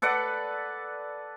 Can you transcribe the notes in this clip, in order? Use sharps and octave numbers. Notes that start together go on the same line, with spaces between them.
A4 B4 D5 F#5